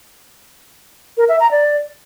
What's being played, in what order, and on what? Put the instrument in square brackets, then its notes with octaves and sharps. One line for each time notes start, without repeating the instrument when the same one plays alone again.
[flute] A#4
E5
A#5
D5